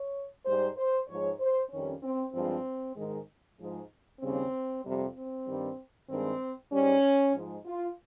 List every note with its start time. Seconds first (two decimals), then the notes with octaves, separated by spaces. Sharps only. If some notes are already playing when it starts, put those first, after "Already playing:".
Already playing: C#5
0.46 G#2 G3 C5
0.77 C5
1.08 G#2 F3 G#3 C#5
1.40 C5
1.70 F2 D#3 G3 C#4
2.02 C4
2.33 G2 F3 G#3 C4
2.96 G#2 D#3 G#3
3.58 G#2 F3 G#3
4.21 D#2 C#3 G3 C4
4.84 F2 C3 G3
5.15 C4
5.46 G2 D#3 G3
6.09 G2 D#3 G#3 C4
6.71 G#2 G3 C#4
7.34 G#2 F3 G#3
7.65 F4